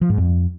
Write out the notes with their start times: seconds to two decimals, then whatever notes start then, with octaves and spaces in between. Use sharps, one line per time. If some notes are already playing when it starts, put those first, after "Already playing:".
0.01 F3
0.10 G#2
0.18 F2